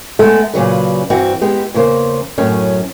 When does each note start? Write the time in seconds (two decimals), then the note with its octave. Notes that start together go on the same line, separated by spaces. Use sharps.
0.19 G#3 A3 B3 A4
0.54 A#2 C#3 F#3 B4
1.10 G2 E3 C4 F#4
1.41 G#3 B3 G4
1.74 E2 C#3 A#3 C5
2.38 F#2 A2 F#3 C#4